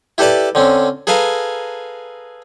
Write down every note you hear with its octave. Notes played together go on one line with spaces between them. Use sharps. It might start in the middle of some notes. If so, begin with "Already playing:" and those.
E4 G4 A4 B4 D5 A5
D3 C4 C#4
G#4 A4 B4 F5 G#5 A#5